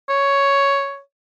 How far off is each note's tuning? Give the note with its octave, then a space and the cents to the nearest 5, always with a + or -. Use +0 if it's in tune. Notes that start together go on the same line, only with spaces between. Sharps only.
C#5 +5